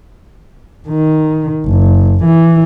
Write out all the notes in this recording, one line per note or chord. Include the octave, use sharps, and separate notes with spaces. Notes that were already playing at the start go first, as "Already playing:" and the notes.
D#3
F#1
E3